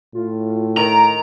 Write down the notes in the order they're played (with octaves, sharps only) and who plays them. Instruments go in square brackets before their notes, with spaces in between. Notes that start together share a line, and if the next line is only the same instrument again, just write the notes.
[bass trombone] A2 [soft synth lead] F4
[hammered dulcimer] D#3 [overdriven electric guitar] A#5 [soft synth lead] D7